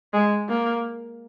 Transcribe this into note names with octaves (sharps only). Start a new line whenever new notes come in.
G#3
A#3